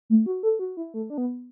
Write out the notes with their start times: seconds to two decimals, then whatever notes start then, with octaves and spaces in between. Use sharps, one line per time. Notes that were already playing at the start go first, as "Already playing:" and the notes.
0.10 A3
0.26 F#4
0.43 A4
0.59 F#4
0.77 E4
0.94 A3
1.10 D4
1.18 B3